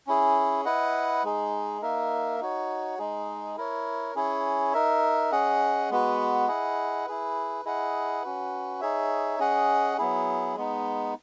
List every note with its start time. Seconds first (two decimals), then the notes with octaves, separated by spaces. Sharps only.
0.07 C#4 E4 G#4
0.65 E4 B4 D#5 F#5
1.24 G#3 D#4 G#4
1.82 A#3 D#4 A#4 E5
2.40 D#4 F#4 C#5
2.98 G#3 D#4 G#4
3.57 E4 A#4 C#5
4.15 C#4 E4 G#4 C#5
4.73 D#4 A#4 E5
5.32 C#4 G#4 D#5 F#5
5.90 G#3 B3 F#4 B4
6.47 E4 G#4 D#5 F#5
7.06 E4 G#4 B4
7.65 E4 G#4 D#5 F#5
8.22 C#4 F#4 B4
8.81 D#4 G#4 C#5 E5
9.39 C#4 G#4 D#5 F#5
9.98 F#3 B3 E4 G#4
10.56 G#3 B3 D#4